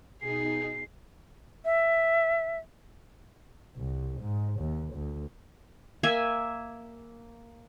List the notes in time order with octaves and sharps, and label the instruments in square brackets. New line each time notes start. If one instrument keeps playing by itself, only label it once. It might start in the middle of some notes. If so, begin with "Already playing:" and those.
[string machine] B2 D#4 [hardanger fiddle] G#4 [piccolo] C7
[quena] E5
[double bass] C2
G#2
D#2
D2
[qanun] A#3 E5 G#5